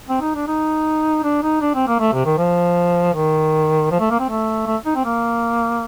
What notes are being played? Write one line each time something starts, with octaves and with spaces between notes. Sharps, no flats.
C4
D#4
D4
D#4
D4
D#4
D4
C4
A#3
A3
C3
D#3
F3
D#3
F3
A3
A#3
C4
A3
A3
D#4
C4
A#3